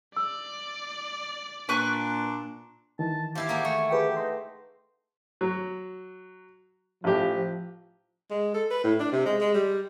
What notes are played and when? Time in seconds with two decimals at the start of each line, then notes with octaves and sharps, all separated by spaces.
0.17 D5 E6
1.69 A#2 D4 B4 C#6 F#6
2.99 D#3 E3 A5
3.35 F3 E4 G4 F5
3.49 A#3 F#4 G#4
3.65 A3 C#6
3.91 G4 G#4 B4 G5
4.17 D#4 C6
5.41 F#3
7.04 A1 F3 G4
8.30 G#3
8.54 A4
8.70 B4
8.84 A2
9.00 D4
9.12 C3
9.25 G#3
9.41 G#3
9.54 G3